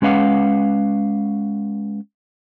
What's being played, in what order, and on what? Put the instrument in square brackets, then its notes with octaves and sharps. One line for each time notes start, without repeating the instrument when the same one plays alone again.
[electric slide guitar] G#3 C#4 B4 F5 F#5